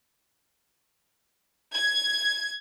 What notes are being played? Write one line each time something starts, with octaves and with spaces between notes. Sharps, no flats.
G#6